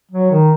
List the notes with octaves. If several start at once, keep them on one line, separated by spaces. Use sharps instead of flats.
F#3
D#3